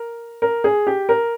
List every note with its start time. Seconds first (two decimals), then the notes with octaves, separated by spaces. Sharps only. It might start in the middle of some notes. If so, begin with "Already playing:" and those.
Already playing: A#4
0.42 A#4
0.64 G#4
0.87 G4
1.09 A#4